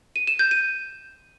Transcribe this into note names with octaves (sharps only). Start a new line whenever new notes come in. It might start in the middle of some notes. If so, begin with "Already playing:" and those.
D#7
E7
G6
D#7